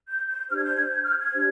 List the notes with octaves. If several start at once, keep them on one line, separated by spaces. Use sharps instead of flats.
G6
G6
D4 G4 C5 F6
G#6
G6
G#6
G6
F6
G#6
D4 G4 C5